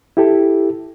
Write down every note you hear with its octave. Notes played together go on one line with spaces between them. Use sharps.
E4 G4 A4